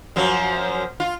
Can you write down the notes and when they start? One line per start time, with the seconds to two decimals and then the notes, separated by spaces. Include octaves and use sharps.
0.16 F#2 F3 F#3
1.00 F4